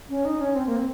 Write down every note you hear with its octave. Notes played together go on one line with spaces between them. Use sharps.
C#4
D#4
C#4
C4
A#3
C4